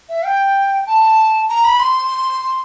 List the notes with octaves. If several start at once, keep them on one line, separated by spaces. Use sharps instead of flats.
E5
G5
A5
A#5
B5
C6